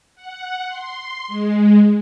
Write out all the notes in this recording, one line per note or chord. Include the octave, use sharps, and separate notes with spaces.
F#5
C6
G#3